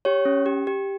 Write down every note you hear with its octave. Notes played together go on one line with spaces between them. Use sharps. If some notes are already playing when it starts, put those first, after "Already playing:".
G4 C#5
C#4
G4
G4